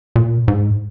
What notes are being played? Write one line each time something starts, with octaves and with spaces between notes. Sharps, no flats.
A#2
G#2